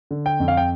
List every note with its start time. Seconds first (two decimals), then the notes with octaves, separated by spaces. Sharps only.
0.11 D3
0.26 G5
0.40 F2
0.48 F5
0.57 G5